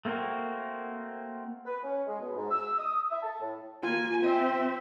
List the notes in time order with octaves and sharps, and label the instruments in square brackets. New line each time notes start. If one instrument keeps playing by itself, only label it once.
[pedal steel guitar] A3 A#3 C4 F#4 A#4
[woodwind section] B4
C#4
G#3
B2
G#2
E6
D#6
E5
A5
A2
[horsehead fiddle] A#3 G#5 [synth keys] F4
[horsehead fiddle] C4 E5